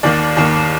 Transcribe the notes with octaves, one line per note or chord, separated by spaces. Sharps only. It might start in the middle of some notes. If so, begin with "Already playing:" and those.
D#2 D#3 A#3 D5
D#2 D#3 A#3